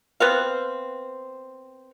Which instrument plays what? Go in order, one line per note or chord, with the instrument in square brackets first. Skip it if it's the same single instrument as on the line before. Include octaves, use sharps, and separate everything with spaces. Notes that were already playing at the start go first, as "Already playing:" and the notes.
[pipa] B3 C4 F5